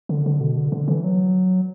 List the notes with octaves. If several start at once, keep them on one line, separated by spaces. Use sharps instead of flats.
D3
D3
B2
D3
D3
E3
F#3